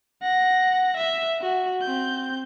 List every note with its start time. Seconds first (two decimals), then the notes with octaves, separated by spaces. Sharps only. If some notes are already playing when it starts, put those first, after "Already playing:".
0.22 F#5 A#6
0.97 E5
1.42 F#4
1.81 C4 G6